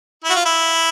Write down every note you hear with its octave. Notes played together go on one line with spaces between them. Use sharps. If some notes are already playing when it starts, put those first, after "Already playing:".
E4
F#4
F4
E4